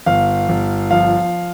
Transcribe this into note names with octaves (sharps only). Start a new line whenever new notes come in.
G1 F5
G1
F3 F5